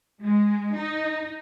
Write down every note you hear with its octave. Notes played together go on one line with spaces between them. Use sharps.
G#3
D#4